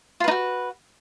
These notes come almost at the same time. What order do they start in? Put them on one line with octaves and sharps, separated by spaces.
F4 B4 D#4 F#4